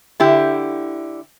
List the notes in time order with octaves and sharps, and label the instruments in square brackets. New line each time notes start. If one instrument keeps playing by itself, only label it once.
[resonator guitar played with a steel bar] D3 E4 G4